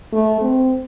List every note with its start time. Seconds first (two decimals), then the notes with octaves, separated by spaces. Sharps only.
0.13 A3
0.41 C4